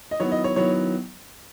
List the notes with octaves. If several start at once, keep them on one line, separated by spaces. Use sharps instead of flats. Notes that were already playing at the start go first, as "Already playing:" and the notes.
D#5
D#3 F#3 B3 E4 C#5
D#5
C#5
D#3 F#3 B3 E4 C#5